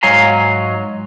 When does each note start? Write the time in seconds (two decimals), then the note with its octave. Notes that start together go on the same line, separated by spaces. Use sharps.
0.03 G#2 F#3 C#5 F5 G#5 A#5